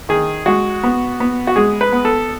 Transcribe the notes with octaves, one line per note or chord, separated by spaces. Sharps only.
D#3 G#4
G#3 F#4
B3
B3
F#4
G#3 G#4
B4
B3
A4